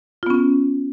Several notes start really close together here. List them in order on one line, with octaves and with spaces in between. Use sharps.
F4 B3 C#4